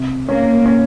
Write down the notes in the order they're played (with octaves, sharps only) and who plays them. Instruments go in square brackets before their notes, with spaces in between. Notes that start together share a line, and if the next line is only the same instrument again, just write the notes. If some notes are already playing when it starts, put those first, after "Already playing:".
Already playing: [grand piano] C3
[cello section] A#3 [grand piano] C#4
[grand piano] C#4